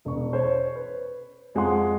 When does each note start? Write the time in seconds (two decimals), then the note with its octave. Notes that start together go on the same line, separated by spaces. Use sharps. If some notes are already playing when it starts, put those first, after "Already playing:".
0.05 E1 C#6
0.33 C5 C#5
0.75 B4
1.55 F2 G#3 F4 F#5 C6 D#6